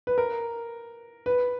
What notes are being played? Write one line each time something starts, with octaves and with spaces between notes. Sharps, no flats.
B4
A#4
B4